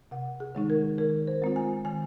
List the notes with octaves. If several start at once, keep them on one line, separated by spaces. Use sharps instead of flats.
C3 F#5
G#4
D#3 G#3 D#4
A#4
D#3 A#4
C5
G#3 C4 F4
G#5
D#3 G#5